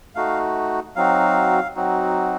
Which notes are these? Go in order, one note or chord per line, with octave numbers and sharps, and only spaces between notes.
A3 D#4 F#4 F5
F#3 C4 D#4 F#4 F5
F#3 C4 D#4 F#4